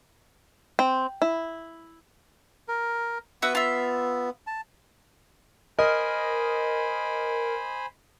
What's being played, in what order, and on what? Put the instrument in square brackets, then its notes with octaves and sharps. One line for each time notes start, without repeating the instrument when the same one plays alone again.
[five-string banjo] C4
E4
[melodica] A#4
[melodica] B3 [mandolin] F#4 B4 E5
[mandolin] F4 E5
[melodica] A5
[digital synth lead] A#4 [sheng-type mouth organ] C5 G#5 B5 [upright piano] D#5